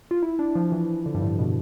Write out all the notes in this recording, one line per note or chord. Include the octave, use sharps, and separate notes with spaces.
F4
E4
D4
F3
E3
D3
G2
A2
B2